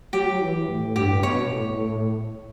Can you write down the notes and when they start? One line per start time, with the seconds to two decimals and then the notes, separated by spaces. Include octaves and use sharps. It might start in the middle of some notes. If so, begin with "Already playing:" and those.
0.13 F#3 G4
0.41 E3
0.69 A2
0.96 G2 G4
1.20 C#3
1.23 B2 C#5
1.51 A2